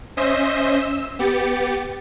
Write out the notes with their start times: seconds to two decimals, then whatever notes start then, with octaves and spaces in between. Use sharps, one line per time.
0.17 C#4 C5 D#5 E5
0.81 E6
1.19 B3 G4 A6 C#7